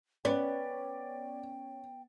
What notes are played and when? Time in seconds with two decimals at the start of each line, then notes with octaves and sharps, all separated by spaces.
0.25 B3 C#4 D5 G5